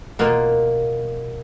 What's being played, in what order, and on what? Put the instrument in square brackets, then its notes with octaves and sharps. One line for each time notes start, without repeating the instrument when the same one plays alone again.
[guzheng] B2 A#3 F4